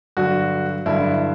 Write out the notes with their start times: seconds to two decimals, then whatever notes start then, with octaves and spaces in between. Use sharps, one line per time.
0.17 G2 D3 F#3 F#4
0.86 G2 D3 F#3 E4